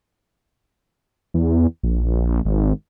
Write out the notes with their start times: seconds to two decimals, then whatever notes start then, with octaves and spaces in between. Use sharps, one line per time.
1.34 E2
1.83 A#1
2.45 G#1